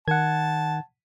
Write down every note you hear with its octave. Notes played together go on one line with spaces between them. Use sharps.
D#3 F#5 A5 G#6